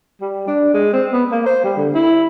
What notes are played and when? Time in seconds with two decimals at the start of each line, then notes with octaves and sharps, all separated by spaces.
0.21 G3
0.47 D4
0.74 G#3
0.93 C4
1.12 B3
1.31 A#3
1.46 C5
1.64 G3
1.77 D3
1.94 E4